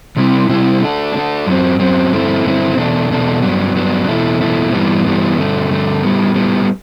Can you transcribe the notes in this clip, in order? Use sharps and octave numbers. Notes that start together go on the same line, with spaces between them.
C3 G3 C4 E4
C3 G3 C4 E4
D3 A3 D4
D3 A3 D4
F#2 F#3 C4
F#2 F#3 C4
G2 D3 A3 C4 E4
G2 D3 A3 C4 E4
E2 B2 A3 D4
E2 B2 A3 D4
G2 F#3 B3 D4
G2 F#3 B3 D4
E2 B2 A3 E4
E2 B2 A3 E4
G2 E3 G3 B3
G2 E3 G3 B3
G2 D3 A3
G2 D3 A3
A2 G3 B3
A2 G3 B3